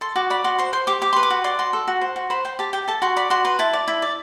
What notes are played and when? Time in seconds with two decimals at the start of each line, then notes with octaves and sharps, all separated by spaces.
0.01 A4 C6
0.16 F#4 D6
0.30 D5 B5
0.44 F#4 C6
0.58 C5 C6
0.73 C5 C6
0.87 G4 D6
1.02 G4 D6
1.13 B4 C6
1.23 D6
1.30 F#4
1.44 D5 C6
1.59 F#4 C6
1.73 A4
1.88 F#4
2.01 C5
2.16 F#4
2.30 C5 B5
2.45 C5 G5
2.59 G4 A5
2.73 G4 G5
2.88 A4 A5
3.02 F#4 C6
3.16 D5 B5
3.30 F#4 C6
3.45 B4 C6
3.59 E4 A5
3.73 D5
3.88 E4
4.02 D5